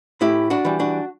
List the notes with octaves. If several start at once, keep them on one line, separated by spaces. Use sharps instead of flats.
A2 E4 G4
D4 F#4
E3 G3
D4 F#4